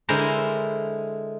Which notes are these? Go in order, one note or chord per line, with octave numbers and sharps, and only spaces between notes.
D3 G#3 E4 A4 A#4 C5